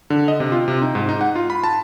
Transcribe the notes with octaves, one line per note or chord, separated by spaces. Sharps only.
D3
D#5
C3
F4
C3
D#4
G#2
D#4
F#5
F4
B5
A5